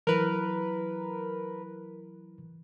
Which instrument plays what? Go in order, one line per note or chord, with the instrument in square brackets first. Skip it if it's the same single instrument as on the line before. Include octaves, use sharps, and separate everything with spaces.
[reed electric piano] E3 F#3 E4 [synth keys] A#4 B4